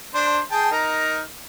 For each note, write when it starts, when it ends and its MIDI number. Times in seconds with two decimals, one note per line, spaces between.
0.14 0.39 62
0.14 0.39 72
0.51 0.70 68
0.51 0.70 79
0.51 0.70 81
0.71 1.21 63
0.71 1.21 70